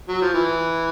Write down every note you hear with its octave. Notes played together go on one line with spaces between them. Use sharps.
F#3
F3
E3